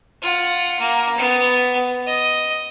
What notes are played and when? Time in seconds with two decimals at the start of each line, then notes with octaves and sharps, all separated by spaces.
0.22 F4 F#5
0.80 A#3
1.17 B3
2.07 D#5